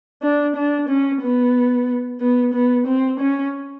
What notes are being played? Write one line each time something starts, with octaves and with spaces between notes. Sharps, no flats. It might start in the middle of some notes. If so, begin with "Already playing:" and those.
D4
D4
C#4
B3
B3
B3
C4
C#4